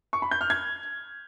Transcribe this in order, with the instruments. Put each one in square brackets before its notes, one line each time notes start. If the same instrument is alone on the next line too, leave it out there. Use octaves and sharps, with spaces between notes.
[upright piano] C#6
B5
G6
F6
G#6